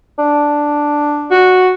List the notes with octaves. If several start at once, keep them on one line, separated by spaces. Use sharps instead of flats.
D4
F#4